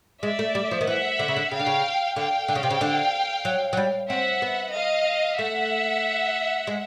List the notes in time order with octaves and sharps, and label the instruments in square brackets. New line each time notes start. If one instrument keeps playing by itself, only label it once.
[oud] G#3 [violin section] D5 E5
[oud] A3
G3
F3
D#3
[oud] E3 [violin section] E5 F#5
[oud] D3
C#3
D3
[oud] C#3 [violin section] F5 G5
[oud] D3
C#3
[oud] D3 [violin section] F5 G5
[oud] D3
C#3
C3
C#3
D3
F#3
F#3
G3
[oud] C4 [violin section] E5 F#5
[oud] B3
[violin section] D#5 F5
[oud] A3 [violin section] E5 F#5
[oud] G#3